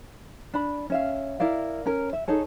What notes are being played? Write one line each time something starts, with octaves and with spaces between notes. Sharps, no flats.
D4 B5
C#4 E5 F5
E4 A#4 D5 F5
C#4 A#4
E5
D#4 G#4 A4 C#5